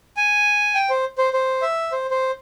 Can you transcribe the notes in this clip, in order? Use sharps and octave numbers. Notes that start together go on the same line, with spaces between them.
G#5
G5
C5
C5
C5
E5
C5
C5